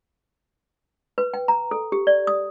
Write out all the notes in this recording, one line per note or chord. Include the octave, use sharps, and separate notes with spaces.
B4
G5
A#5
A4
G4
D5
D#6